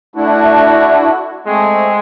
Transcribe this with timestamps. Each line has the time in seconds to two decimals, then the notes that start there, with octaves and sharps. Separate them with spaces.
0.16 A3 D4 E4 F#4
1.46 G#3 A3 C4